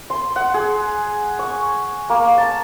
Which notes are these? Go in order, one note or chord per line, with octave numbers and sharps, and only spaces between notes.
C6
F#5
G#4
C#6
A#3
A5